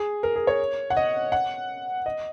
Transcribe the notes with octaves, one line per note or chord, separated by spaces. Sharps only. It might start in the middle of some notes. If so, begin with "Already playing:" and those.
Already playing: G#4
A#4
G#4
C#5
F#5
D#5
F#5
D#5